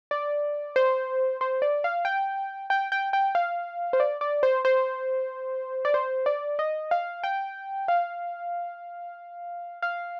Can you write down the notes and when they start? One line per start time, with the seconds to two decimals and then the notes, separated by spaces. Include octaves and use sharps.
0.11 D5
0.76 C5
1.41 C5
1.62 D5
1.84 F5
2.05 G5
2.70 G5
2.92 G5
3.13 G5
3.35 F5
3.93 C5
4.00 D5
4.21 D5
4.43 C5
4.65 C5
5.85 D5
5.94 C5
6.26 D5
6.59 D#5
6.91 F5
7.23 G5
7.88 F5
9.82 F5